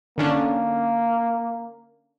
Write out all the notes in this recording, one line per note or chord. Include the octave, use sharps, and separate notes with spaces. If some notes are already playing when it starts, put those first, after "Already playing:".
D3 A#3 C#4 D4